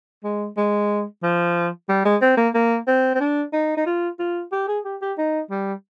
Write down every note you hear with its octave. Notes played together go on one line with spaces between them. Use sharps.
G#3
G#3
F3
G3
G#3
C4
A#3
A#3
C4
C4
D4
D#4
D#4
F4
F4
G4
G#4
G4
G4
D#4
G3